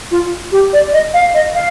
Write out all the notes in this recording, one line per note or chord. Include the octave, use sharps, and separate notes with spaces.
F4
G4
D5
D#5
F5
D#5
F5